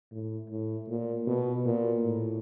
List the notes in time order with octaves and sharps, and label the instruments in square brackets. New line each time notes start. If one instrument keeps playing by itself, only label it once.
[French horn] A2
A2
A#2
B2
A#2
A2